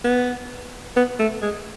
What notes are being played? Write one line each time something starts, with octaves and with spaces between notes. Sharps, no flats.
B3
B3
A3
G#3